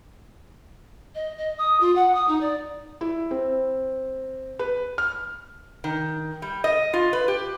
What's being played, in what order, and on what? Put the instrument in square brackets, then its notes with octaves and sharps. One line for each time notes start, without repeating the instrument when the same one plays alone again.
[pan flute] D#5
D#5
D#6
F4
F#5
D#6
D#4
D5
[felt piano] E4
C4
B4
F6
[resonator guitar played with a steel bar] D#3
G3
D#5
F4
B4
G4